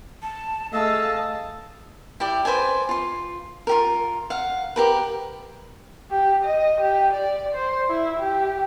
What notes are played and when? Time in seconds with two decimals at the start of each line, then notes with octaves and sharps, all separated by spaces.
0.22 A5
0.73 A3 G#4 D#5 F5 A5 E6
2.20 E4 G4 D5 G5
2.45 B4 C5 D5 G#5
2.89 F4 C6
3.67 F4 G4 A#4
4.30 F5 F#5
4.76 G4 A#4 B4
6.11 G4
6.44 D#5
6.80 G4
7.13 D5
7.54 C5
7.89 E4
8.19 G4